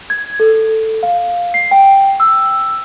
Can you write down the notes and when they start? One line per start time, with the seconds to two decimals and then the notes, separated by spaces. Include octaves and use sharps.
0.10 G#6
0.40 A4
1.03 F5
1.54 C7
1.71 G5
2.20 E6